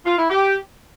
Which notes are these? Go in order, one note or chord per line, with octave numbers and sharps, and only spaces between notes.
F4
E4
G4